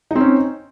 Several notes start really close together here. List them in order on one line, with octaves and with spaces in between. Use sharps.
D#4 C4 C#4